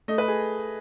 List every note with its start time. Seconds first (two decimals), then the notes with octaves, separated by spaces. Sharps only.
0.08 A3 D#5
0.18 B4
0.28 G#4